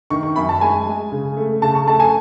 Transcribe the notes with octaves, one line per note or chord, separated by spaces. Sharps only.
D#3 C#6
C#6
F#2 B5
A5
G#3 G#5
G#3
C#3
A3
C#3 A5
C#6
A3 A5
G#5